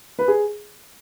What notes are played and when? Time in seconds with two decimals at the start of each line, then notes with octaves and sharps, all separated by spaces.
0.19 B4
0.28 G#4